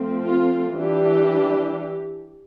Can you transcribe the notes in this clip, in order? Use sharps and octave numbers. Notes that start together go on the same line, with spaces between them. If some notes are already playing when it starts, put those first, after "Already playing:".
Already playing: F3 A3 C4
F4
E3 G3 D4 G4